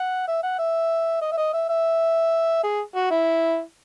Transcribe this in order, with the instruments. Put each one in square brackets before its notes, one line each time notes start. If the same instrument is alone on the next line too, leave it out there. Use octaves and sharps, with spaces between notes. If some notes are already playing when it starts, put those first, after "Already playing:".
Already playing: [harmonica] F#5
E5
F#5
E5
D#5
E5
D#5
E5
E5
G#4
F#4
E4